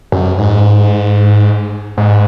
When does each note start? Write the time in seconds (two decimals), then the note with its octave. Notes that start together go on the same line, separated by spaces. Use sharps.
0.12 F#2
0.38 G#2
1.97 G#2